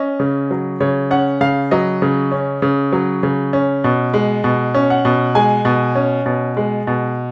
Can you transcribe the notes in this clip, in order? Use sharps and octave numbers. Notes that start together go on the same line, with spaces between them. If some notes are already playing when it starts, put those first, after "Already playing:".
Already playing: C#4 D#5
C#3
F#3
C#3 C#5
C#4 F#5
C#3 F5
F#3 D#5
C#3
C#4
C#3
F#3
C#3
C#4
B2
G#3
B2
C#4
F#5
B2
G#3 G#5
B2
C#4
B2
G#3
B2